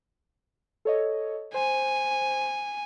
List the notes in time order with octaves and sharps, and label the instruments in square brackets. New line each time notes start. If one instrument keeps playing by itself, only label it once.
[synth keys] A4 C#5 D#5
[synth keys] C5 [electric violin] G#5